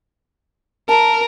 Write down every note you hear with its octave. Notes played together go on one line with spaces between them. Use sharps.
A#4 A5